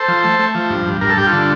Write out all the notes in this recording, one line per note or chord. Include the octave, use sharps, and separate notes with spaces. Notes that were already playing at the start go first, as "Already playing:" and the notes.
Already playing: A4 C5
F3
A3
A3
F3
G2
G2
G2 A#4
A4
G2 G4
F4 A4
D3